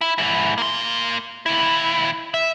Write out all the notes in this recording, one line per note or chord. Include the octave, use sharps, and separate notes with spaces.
E4
G#2 E4
A#3 C6
D#2 E4
E5